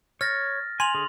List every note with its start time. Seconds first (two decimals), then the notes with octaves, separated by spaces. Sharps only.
0.21 C#5 F6 A6 A#6
0.80 G#5 C6 F7 F#7
0.95 D3 G#4